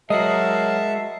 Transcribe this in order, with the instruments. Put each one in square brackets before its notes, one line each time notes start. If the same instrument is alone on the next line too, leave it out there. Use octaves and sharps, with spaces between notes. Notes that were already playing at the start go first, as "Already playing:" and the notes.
[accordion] F#3 A#4 [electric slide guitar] G#3 F#4 [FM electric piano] D#5 C7 [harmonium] E5 A5